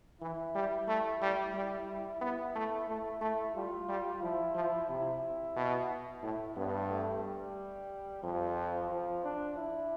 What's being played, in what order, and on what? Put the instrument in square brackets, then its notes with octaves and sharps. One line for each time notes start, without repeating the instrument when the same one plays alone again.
[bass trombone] E3 [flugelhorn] E4
[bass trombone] G3
A3
G3
G3
[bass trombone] B3 [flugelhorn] E4
[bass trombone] A3
[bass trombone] A3 [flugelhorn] E4
[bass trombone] A3
[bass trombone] G3 [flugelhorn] F4
[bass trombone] G3
[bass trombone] F3 [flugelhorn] E4
[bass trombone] F3
[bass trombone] C3 [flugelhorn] E4
[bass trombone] B2
[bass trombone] A2 [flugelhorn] E4
[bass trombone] G2 [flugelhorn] B3
[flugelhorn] A3
G3
[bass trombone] F2 [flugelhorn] F3
[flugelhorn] F3
D4
E4